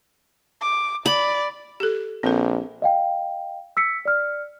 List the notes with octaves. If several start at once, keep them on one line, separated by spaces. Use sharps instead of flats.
D6
D5 B5
G4 A4
A#1 C4 A4 B4
D#5 F5 G5
E6 B6 C#7
D5 F6